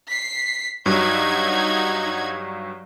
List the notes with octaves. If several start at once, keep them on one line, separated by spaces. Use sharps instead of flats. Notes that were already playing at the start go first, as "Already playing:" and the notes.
B6 C7
G2 F#3 D#4 F#4 G#6